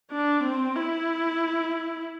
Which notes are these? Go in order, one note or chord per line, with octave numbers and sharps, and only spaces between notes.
D4
C4
E4